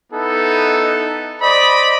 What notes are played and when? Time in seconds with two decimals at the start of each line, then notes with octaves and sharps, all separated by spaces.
0.13 B3 D#4 E4 A4
1.42 C5 D5 D#5 B5